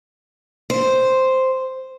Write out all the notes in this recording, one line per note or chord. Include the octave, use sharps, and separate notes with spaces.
C5